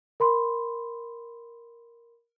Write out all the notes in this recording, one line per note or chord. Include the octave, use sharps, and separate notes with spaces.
A#4 B5 C6